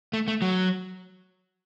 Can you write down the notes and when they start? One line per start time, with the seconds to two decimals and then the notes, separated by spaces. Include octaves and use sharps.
0.13 A3
0.28 A3
0.42 F#3